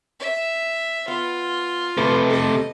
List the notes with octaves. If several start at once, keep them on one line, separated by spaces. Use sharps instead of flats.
E5
B3 F4
C3 A3 B4
A4 D#5